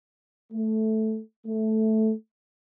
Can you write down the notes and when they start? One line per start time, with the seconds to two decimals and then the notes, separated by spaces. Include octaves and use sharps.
0.53 A3
1.46 A3